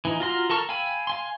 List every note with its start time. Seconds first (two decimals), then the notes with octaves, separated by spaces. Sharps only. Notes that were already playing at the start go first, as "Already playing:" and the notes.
0.05 E3 D#4
0.20 F4 F#4 A#5 C6 F6
0.50 A4 A#4 A5 C#6 F6
0.69 F5 G5 G#5 B5 E6
1.07 F5 G#5 C6